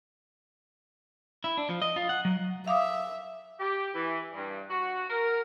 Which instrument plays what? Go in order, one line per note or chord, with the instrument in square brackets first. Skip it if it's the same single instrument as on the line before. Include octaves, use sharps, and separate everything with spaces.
[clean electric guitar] E4
D4
F3
D#5
F4
F#5
F#3
[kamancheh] E5 [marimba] F5 D6 D#6
[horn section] G4
E3
G2
F#4
A#4